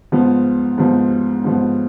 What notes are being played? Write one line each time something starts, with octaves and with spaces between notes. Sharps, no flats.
G#2 F3 B3
G#2 F3 B3
G#2 F3 B3